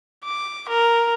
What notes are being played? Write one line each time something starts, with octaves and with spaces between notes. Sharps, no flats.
D6
A#4